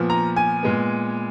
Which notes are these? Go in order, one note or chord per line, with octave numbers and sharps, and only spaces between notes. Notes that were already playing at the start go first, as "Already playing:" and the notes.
Already playing: A#2 F3 B3
A#5
G#5
A#2 G#3 B3